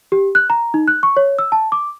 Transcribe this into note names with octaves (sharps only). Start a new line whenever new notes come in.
G4
F#6
A#5
D#4
F#6
C#6
C#5
E6
A5
D6